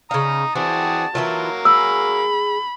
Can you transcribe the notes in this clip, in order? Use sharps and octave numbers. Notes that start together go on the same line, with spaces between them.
C#3 F5 A#5 D#6
E3 C4 E4 F#4 G#4 D5 A5
E3 F#3 A#3 E4 F4
G#4 B5 E6